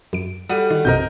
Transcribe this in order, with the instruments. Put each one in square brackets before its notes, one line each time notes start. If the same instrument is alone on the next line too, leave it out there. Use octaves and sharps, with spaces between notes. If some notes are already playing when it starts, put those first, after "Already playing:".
[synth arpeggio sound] F#2 D7
[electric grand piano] G3 F#5 D#7 [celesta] F#4 A4 [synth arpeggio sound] D#6
[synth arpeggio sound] D#3
[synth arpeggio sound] B1 F#2 C3 [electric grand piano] A#4 D#5 G6